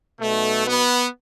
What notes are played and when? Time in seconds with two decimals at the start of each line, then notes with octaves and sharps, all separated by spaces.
0.19 B1 B2 A3
0.66 B3